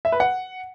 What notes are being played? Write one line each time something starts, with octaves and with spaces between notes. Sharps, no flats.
E5
B4
F#5